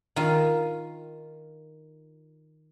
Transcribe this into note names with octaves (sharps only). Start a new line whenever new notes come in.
D#3 F4